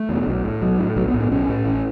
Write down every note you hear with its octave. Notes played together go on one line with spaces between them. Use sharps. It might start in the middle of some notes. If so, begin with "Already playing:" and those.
Already playing: A3
E2 B2
B1
A2
B1 F#3
A2
B1 F#3
B3
A2
B3
B1 C#4
A2
A1